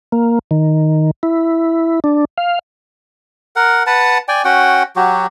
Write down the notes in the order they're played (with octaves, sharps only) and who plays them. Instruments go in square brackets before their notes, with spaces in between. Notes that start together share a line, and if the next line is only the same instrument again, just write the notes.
[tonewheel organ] A#3
D#3
E4
D4
F5
[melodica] A#4 F#5
B4 F#5 A5
D5 G5 G#5
C#4 F#4 F#5 G5
F#3 F#4 G4